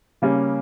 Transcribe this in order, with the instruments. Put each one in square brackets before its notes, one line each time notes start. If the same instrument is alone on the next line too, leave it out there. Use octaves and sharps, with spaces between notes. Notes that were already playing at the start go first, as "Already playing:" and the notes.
[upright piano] C#3 G3 A#3 C#4